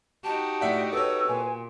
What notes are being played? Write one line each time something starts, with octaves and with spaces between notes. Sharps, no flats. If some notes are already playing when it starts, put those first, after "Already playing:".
D#4 F#4 G4 A5
A2 D5 E5 F#5
A4 B4 C#5 E6
A#2 G#5